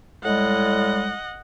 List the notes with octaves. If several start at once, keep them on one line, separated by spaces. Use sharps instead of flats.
A2 G3 G#3 D#5 F#5